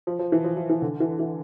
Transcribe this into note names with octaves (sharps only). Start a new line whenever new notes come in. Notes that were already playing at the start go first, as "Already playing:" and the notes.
F3
F3
E3
F3
F3
E3
D3
E3
E3